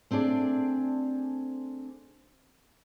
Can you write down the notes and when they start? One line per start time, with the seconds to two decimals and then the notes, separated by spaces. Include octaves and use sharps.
0.11 A3 C4 D4 G#4 D5